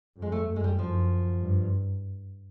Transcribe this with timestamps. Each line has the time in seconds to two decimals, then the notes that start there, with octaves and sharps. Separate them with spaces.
0.17 F2
0.22 G#3
0.32 A3
0.48 F#2
0.56 G#3
0.64 G3
0.79 F#2 F3
1.42 G2